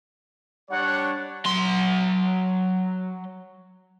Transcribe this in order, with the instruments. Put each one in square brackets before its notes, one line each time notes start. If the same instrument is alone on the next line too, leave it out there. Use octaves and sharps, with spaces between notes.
[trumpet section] G3 D4 C#5 [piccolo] F#5
[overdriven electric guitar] F#3 C6